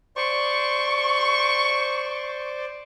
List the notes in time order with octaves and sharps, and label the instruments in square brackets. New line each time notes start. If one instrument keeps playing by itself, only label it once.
[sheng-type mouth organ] C5 D5 [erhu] C#6